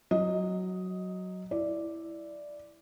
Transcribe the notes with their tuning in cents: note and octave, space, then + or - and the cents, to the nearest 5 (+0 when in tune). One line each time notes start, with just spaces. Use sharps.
F#3 +0 D#5 +5
E4 +0 D5 +0